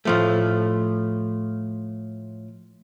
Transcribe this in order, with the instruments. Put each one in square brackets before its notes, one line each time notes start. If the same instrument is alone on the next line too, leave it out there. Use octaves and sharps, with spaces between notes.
[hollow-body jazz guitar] A2 F3 A3